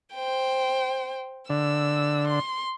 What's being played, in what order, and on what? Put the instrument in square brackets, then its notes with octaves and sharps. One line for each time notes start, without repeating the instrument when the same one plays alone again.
[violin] C5 G5
[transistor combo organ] D3 [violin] E6
[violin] C6